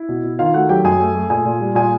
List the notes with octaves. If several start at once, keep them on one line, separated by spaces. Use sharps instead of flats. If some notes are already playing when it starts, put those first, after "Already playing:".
Already playing: E4
B2
B2
D#3 F4 F5
A3 F#4 F#5
F#3 G4 G5
F#2 G#4 G#5
A3
A3
A#2 G#4 G#5
A#2
G3
A#2 G#4 G#5